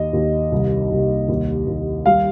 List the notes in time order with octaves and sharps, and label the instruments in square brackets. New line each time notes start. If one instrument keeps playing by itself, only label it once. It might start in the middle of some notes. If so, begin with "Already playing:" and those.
Already playing: [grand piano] D#2 D#5
D#2
C2
C2
D#2
D#2
G3 F5